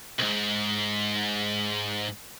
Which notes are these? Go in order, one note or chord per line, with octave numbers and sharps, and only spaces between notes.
B1 G#2